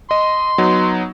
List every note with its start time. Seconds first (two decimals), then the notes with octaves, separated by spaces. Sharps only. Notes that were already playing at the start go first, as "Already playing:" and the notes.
0.11 D#5 C6
0.58 F#3 B3 D#4